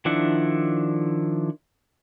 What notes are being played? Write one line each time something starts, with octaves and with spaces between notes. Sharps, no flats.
D#3 F3 D4 E4 F#5